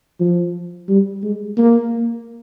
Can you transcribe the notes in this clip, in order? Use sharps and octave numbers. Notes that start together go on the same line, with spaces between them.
F3
G3
G#3
A#3